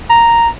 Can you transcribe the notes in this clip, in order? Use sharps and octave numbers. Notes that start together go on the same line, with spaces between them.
A#5